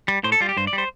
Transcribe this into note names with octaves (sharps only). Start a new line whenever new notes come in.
G3
A2 C5
A4
G3 F4
G4
G2 C5
D5
G3
C5